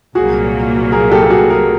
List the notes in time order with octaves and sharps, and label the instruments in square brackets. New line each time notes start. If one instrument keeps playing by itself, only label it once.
[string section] C2 A#2 F#3 A#3 [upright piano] F#4 G#4
[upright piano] G#4 A#4
G4 A4
A4
F#4 G#4
G#4 A#4